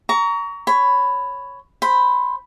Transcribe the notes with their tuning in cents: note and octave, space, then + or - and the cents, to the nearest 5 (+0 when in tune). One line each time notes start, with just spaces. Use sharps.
A#5 +0 C#6 +30
C#5 +0 B5 +10
C5 +0 B5 +0